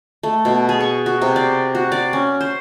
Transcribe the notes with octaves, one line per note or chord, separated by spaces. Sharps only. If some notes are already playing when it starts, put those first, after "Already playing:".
A3
B2
G#4
C#6
F#4
C3
D5
F#4
D5
C#4
C5